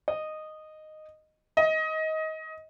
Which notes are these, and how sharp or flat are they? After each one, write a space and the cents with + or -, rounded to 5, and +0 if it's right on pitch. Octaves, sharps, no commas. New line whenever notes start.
D#5 -10
D#5 +20